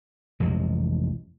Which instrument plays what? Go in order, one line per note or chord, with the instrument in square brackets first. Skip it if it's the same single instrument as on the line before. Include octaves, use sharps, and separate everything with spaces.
[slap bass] A1 F2 C3 G#3